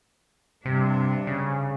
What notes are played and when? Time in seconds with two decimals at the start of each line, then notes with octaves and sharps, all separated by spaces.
0.65 G2 C3 D4
1.27 C#3